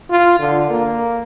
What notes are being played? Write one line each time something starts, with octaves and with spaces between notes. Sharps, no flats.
F4
D3
A#3